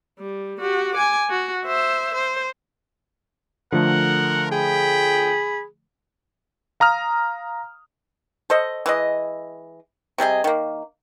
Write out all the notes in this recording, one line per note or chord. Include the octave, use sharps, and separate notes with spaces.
G3
F#4 G4
G#5 D6
F#4
C5 E5
C5
D3 F3 A3 A#4 F#5
G#4 G5 B5
F5 A#5 D#6 F6
A4 C5 D#5
E3 G#3 D#5
C3 G3 G#4 D#5
D#3 A#3